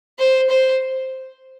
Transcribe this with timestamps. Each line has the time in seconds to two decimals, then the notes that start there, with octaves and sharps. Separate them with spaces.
0.19 C5
0.49 C5